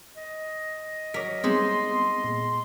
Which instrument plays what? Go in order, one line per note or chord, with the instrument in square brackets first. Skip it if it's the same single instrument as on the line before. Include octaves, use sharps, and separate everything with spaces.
[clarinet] D#5
[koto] F#3 A#4 [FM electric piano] D6 B6
[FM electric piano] G3 B3 C4 [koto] G#3 D#4 E5 [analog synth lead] C6
[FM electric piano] A#2 G#4